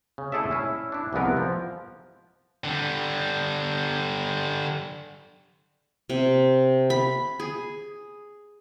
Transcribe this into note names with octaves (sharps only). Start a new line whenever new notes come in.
C#3
A3 E4 G#4 A4 D5 E5
C#4 E4
D4 E4
C2 E3 F3 G#3 B3 A#4
F3
D3 G3
C3
B5
G#4